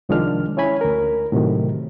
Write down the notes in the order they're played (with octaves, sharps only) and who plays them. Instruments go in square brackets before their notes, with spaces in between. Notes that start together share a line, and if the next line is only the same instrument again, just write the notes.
[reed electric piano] C2 D#3 F3 G#3 D4 F6
C#4 E4 C#5 G#5 B5
D2 A#4
A2 C3 D#3 F#3